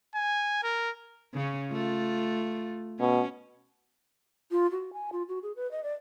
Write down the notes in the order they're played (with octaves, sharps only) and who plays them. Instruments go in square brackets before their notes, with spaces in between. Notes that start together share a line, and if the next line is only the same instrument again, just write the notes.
[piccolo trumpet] G#5
A#4
[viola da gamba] C#3 C#4
A3 F4
[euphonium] B2 [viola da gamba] C#4
[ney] F4
F#4
G#5
F4
F#4
G#4
B4
D#5
D5